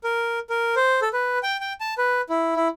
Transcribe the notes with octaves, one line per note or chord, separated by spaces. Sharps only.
A#4
A#4
C5
A4
B4
G5
G5
A5
B4
E4
E4